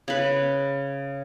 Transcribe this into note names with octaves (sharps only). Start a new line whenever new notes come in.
C#3 B4